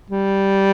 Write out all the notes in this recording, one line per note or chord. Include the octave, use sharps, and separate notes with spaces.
G3